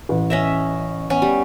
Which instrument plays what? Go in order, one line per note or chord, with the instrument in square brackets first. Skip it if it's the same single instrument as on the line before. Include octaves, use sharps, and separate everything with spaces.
[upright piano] A1
[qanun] C#4 D#5 E5
B3 C#4 G#5
G3